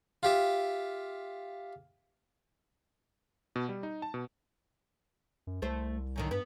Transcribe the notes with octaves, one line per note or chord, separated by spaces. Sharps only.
F4 G4 E5
B2
G3
D#4
A5
B2
F#2
C2 A3 C5
F#2 D3 D#3
G2 B3